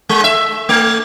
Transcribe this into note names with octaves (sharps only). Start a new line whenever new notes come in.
G#3
E5
A3